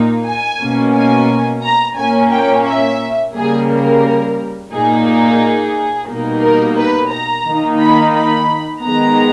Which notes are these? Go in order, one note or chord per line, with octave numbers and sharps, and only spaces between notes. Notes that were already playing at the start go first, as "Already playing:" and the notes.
Already playing: A#2 A#3 D#4
G#5
B2 A#3 C#4
G#5
A#5
A#2 A#3 C#4 G#5
G5
E5
C#3 G3 A#3 G#4
A#4
A#2 A#3 D#4 G#4
G#4
B2 G3 A#3 D#4
A#4
B4
A#5
D#3 A#3 D#4
B5
B5
D#3 G#3 B3 A#5